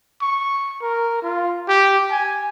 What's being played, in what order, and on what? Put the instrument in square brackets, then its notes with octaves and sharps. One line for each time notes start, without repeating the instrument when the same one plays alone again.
[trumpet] C#6
A#4
F4
G4
G#5